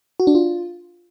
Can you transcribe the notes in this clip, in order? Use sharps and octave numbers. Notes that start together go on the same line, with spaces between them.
F#4
D4
F4